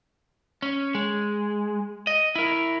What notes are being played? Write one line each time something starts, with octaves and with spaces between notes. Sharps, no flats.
C#4
G#3
D#5
E4 A#4